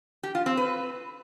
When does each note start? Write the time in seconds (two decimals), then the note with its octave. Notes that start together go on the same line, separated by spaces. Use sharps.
0.23 G4
0.35 F4
0.46 C4
0.57 B4